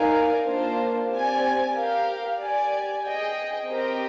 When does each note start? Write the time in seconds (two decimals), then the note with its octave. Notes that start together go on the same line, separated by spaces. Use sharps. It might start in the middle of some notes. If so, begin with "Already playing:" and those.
Already playing: D#4 A#4 D5 F5 G#5
0.46 A#3 D4 F4 C5
1.10 C4 G4 D5 G#5
1.74 G4 A#4 F5
2.40 G4 D5 G#5
3.04 G#4 D#5 G5
3.69 C4 G4 A#4 D#5 G5